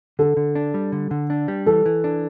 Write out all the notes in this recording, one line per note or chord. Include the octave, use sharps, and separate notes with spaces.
D3 A4
D3
D4
G3
D3
D3
D4
G3
E3 A4
E3
D4